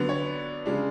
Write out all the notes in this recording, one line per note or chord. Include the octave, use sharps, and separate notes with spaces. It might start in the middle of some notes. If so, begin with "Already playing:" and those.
Already playing: D3 F#3 B3 D4
C#5
C#3 G#3 D4